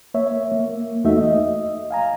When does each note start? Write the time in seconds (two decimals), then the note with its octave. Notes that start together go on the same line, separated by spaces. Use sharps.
0.14 A#3 C#5 E5
0.52 A#3
1.04 E2 A3 D#4 F#4 E5
1.21 D#5
1.91 F5 G#5 A#5